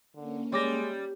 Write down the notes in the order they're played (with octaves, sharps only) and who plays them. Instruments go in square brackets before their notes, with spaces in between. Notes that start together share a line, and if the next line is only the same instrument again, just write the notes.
[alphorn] D3 [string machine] A#3 C#4
[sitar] G3 [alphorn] G#3 [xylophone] C#5 D6 A#6